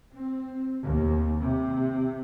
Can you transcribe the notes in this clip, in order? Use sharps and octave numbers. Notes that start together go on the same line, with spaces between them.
C4
D#2
C3